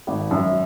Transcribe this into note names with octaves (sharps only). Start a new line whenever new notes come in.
G#1
F#2